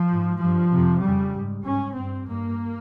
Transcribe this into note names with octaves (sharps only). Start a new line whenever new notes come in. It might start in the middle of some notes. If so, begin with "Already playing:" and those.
Already playing: F3
G#2
G2 F3
F2 C3
F2 C#3 G3
G#2
G#2 C#4
G2 C4
G2 A#3